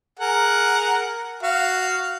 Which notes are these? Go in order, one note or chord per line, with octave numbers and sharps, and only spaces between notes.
G#4 A#4 F#5
F#4 F5